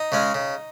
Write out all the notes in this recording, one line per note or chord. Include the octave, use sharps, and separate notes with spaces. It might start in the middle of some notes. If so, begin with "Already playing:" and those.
Already playing: D#4
C#3 G#3 C#4
C#3